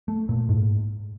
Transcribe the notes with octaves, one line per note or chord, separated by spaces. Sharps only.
A3
A#2
G#2